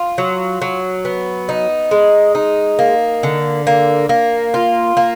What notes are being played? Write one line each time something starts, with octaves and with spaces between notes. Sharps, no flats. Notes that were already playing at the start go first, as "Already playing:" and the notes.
Already playing: F4
F#3
F#3
B3
D#4
G#3
D#4
A#3
D3
A#3
A#3
F4
A#3